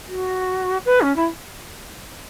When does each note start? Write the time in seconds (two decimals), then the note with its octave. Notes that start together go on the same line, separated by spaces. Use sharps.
0.09 F#4
0.85 B4
1.01 C#4
1.16 E4